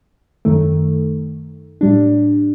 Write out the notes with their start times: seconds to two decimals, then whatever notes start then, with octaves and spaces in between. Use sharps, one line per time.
0.45 F#2 D#3 A3
1.81 A2 G3 D4